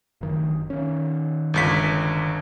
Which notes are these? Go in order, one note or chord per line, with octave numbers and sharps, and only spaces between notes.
F#1 D#3
D#3 C#4
G1 C#2 B6